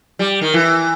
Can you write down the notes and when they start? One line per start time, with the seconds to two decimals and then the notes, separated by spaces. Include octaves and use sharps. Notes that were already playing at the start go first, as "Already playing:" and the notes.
0.19 G3
0.42 D#3
0.54 E3